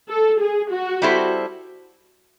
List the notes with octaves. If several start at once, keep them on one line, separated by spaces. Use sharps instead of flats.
A4
G#4
F#4
G3 C4 E4 A4 C5